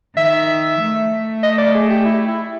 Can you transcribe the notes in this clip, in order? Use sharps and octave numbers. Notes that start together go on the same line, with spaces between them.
D#3 E5
A3
D#5
D5
G#4
G4
E4
E4